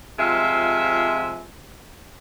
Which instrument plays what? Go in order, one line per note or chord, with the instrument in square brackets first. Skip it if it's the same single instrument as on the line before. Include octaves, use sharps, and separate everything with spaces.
[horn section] C3 F3 G#3 F4 E5